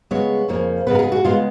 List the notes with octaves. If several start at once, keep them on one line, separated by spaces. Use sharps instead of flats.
C#3 G#3 B3 C#5
F2 C#3 F3 A#3
C#3 G#3 B3 B4
A#4
G#4
F#4
C#3 G#3 B3 F4